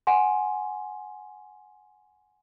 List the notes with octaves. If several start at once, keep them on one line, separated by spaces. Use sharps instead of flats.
F#5 G#5 C6